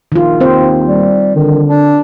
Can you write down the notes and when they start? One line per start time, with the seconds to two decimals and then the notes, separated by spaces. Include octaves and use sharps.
0.12 A#1 D#3 F4
0.41 D#2 C4 C5
0.86 G3
1.36 D3 D#3
1.68 D4